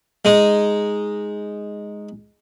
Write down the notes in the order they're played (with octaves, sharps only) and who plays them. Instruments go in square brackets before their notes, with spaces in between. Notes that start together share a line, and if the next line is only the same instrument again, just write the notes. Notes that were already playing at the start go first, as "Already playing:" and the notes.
[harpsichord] G#3 D#4